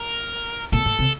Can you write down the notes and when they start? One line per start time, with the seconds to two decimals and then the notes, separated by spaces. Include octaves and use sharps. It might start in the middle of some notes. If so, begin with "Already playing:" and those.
Already playing: A#4
0.72 A#2 A4
0.86 A2
0.99 C3